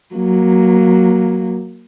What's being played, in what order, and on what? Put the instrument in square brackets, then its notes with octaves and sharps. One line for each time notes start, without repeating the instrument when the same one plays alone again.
[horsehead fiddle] F#3 A#3